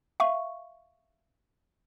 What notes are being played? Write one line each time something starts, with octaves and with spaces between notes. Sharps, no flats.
E5 F5 C#6